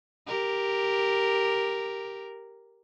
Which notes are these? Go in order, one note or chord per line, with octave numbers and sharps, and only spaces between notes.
G4 A#4